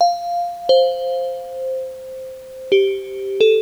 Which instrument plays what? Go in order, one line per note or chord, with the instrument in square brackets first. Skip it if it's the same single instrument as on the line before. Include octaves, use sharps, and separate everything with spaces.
[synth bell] F5
C5
G4
A4